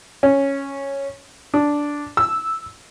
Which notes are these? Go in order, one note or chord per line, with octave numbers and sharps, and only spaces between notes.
C#4
D4
E6